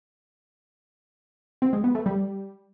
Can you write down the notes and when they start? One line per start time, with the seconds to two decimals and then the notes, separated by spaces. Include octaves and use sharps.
1.62 C4
1.73 G#3
1.84 B3
1.95 A3
2.06 G3